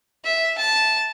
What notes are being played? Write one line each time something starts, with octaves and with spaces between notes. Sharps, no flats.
E5
A5